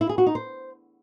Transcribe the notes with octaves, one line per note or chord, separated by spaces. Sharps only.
E4
G#4
F#4
D#4
C5